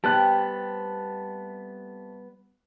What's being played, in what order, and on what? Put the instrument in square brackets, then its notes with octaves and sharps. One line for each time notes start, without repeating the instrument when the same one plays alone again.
[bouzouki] C3 A3 G5 [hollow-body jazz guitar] G3 B3 C5 [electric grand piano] A5 F#6